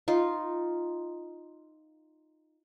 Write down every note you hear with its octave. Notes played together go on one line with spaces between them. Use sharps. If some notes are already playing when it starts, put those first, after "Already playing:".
D#4 F4